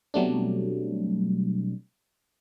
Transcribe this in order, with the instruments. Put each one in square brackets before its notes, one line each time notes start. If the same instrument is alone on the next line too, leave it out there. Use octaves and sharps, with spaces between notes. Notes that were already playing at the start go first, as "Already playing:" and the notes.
[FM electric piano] B2 F#3 G3 A3 C4 D4